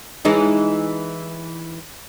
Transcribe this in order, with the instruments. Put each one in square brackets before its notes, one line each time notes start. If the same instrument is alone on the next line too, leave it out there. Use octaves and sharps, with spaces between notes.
[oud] E3 G#3 D#4